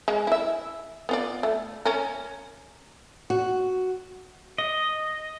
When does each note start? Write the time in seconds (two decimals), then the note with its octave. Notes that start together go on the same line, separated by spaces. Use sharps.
0.08 G#3
0.27 E4 E5
1.09 B3 F4 D5
1.43 A3
1.85 C#4 A#4
3.30 F#4
4.58 D#5